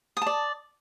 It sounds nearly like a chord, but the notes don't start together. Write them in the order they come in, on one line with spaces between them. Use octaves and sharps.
D#6 A5 D5